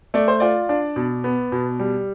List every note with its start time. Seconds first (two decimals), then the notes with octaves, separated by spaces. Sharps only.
0.14 A3 D5
0.28 C5
0.40 F4 D5
0.69 D4
0.96 B2
1.24 B3
1.52 B2
1.79 G3